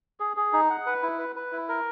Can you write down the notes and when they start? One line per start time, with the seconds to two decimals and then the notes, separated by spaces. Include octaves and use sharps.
0.20 G#4
0.37 G#4
0.53 D#4
0.70 F#5
0.86 B4
1.03 E4
1.19 B4
1.36 B4
1.52 E4
1.69 A#4